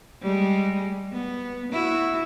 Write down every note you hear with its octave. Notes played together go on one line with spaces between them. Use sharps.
G3 G#3
B3
E4 F#4